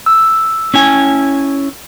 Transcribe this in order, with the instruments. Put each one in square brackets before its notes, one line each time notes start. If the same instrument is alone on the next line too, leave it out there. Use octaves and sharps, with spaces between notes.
[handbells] E6
[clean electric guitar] C#4 E4 G#5